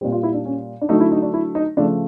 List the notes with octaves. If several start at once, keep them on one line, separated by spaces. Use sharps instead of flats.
A#2 G3 C4
F4
E4
D4
C#4
D4
D3 F#3 A3 D#4
E4
D#4
D4
E4
D#4
C#3 F3 A3 D4